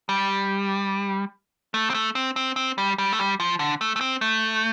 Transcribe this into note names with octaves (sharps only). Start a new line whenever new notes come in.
G3
A3
C4
A3
C4
C4
C4
G3
G3
A3
G3
F3
D3
A3
A3
C4
A3